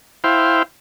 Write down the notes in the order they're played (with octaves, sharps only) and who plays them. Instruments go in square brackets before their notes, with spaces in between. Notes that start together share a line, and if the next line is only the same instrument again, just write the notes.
[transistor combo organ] E4 C5 F5 G5